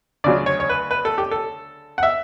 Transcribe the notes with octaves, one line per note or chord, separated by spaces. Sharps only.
D2 C#3 F#3 D5
C#5
C#5
B4
B4
A4
G4
A4
F#5
E5